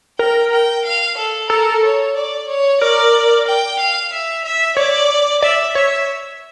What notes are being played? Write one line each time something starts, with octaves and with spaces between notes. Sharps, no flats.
A#4 G5
G5
F5
A4
A4 A#4
C#5
D5
C#5
A#4 D5
G5
F5
E5
E5
C#5 D5
D5 E5
C#5 E5